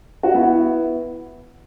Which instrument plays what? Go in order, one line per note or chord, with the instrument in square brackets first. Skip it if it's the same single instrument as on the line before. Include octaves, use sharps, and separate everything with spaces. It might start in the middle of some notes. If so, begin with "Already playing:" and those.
[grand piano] F#4
B3 E4